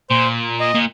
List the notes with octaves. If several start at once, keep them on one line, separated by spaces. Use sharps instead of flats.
A#2 C5
D#5
A#2